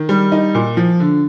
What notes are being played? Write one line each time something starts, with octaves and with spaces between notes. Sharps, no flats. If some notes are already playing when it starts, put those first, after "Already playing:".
Already playing: D#3
G3
D#4
A#2
F3
D3